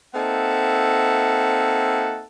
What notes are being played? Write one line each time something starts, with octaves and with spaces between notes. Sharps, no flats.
A#3 C4 D#4 A4 E5 F#5